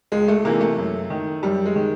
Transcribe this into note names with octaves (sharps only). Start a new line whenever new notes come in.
C#2 G#3
A3
C3 E3 A#3
A3
F#2
D#3
F#2 G3
G#3
D#3